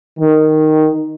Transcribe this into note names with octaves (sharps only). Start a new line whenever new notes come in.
D#3